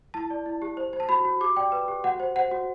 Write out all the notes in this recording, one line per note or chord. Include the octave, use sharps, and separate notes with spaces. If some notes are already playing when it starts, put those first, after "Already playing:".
E4 A5
D5
E4
G4
C5
C5
A5
F#4 B5
F#4
G4 D6
D5 G5
B4
G4
F#4 F#5
C5
C5 F#5
F#4